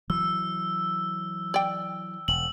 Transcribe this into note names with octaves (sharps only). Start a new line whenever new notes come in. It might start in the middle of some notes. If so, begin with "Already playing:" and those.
E3 F#3 E6
D5 G5
E1 F#7